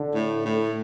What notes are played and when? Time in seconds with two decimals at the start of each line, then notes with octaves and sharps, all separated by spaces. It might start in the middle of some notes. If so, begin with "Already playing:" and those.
Already playing: D3
0.14 A2
0.46 A2